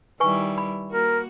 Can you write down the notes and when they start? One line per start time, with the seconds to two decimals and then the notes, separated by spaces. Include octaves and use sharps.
0.20 D#3 G3 E4 B4 G#5 C#6
0.58 B5
0.91 A#3 F#4 A#4